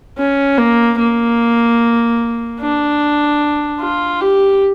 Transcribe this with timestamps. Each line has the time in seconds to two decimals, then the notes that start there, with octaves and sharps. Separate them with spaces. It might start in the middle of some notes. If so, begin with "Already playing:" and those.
0.18 C#4
0.58 A#3
0.98 A#3
2.60 D4
3.81 F4
4.21 G4